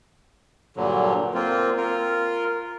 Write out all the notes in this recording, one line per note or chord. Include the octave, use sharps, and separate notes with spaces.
G2 A#2 D3 F#3
A#3 C4 F4
F4 A#4